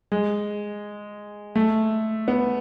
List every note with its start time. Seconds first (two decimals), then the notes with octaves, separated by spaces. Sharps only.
0.12 G#3
1.55 A3
2.28 B3